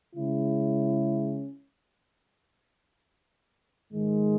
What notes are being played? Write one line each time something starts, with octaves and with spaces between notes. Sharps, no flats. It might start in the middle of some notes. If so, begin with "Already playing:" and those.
C#3 G#3 C#4 E4
G#2 D#3 G#3